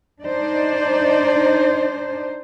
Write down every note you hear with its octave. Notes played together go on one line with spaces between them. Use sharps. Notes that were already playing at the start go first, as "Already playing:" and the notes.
D4 D#4 C5 D5